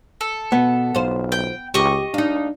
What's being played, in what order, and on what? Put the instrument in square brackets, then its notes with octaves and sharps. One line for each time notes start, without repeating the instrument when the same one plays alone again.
[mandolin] A4
[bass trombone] B2 [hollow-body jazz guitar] B3
[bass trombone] B1 [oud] F4 C5
[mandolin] G5
[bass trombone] C#2 [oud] G4 [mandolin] D#5 C#6
[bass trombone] D4 [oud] D#4 F5